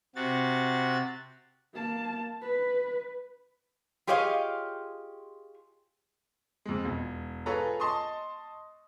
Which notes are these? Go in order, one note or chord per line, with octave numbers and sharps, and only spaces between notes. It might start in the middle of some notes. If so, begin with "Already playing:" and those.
C3 F#4 A6
A#3 A5
B4
F4 G4 G#4 C#5 D#5 F5
F2 G#3
E1
F4 G#4 A4 B4 C#5 A#5
D#5 A5 C6 C#6 D#6